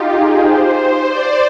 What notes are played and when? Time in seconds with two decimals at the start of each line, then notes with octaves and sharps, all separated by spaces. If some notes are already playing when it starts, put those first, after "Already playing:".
Already playing: D#4 F4 G4
0.09 G#4
0.40 C5
1.06 D5